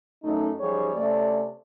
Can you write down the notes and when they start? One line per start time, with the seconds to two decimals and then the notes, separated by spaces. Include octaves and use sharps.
0.23 F#2 A3 D#4
0.60 F#2 F3 G3 D#4 G#4 C#5
0.95 C3 A3 C#4 C#5 D5